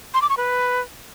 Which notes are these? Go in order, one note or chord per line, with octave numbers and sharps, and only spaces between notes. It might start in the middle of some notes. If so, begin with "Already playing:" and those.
C6
D6
C#6
B4